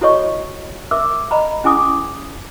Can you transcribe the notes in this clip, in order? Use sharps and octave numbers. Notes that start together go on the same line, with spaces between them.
E4 F#4 A4 C#5 D#5 C#6
A#4 E5 D6 E6
D#5 A#5 B5
C#4 E4 G#4 G#5 D6 D#6